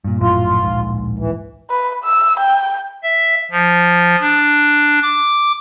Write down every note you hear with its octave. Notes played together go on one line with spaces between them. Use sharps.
G2 A#2
A#1 F#2 A2 F4
D1 A#1 G#2
E3
B4
E6
G5
E5
F3
D4
D6